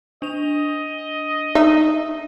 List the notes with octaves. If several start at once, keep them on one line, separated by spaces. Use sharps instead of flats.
D4 D#5 F7
D#4 E5